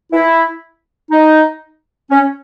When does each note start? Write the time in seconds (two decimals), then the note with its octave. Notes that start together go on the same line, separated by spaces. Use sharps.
0.13 E4
1.11 D#4
2.11 C#4